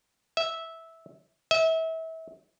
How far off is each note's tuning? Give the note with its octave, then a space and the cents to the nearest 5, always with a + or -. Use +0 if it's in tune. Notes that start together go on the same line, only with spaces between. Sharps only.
E5 -10
E5 -30